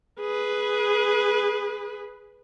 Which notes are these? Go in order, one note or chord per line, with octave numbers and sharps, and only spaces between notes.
G#4 B4